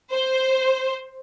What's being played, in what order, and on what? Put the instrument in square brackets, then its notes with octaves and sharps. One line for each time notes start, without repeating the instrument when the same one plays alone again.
[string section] C5